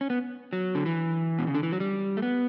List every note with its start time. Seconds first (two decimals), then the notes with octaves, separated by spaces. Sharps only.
0.01 C#4
0.10 B3
0.53 F#3
0.75 D3
0.86 E3
1.39 B2
1.47 C#3
1.55 D3
1.63 E3
1.72 F#3
1.80 G3
2.17 A3
2.22 B3